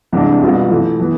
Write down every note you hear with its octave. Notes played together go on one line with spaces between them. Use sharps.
C2 C3 E3 G#3 D4
C2 B2 B3 F4
E3 A3 E4
E3 B3